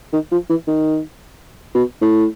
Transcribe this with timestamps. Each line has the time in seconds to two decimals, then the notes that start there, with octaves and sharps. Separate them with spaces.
0.13 D#3
0.32 F3
0.50 E3
0.67 D#3
1.75 B2
2.01 A2